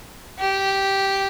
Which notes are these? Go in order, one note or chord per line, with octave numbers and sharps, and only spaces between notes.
G4